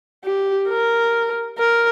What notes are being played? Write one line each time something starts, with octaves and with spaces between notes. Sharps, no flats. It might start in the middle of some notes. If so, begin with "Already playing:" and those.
G4
A#4
A#4